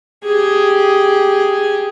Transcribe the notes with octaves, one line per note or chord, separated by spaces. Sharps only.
G4 G#4